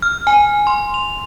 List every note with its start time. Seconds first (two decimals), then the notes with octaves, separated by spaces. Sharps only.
0.02 F6
0.27 G#5
0.67 C6
0.94 F7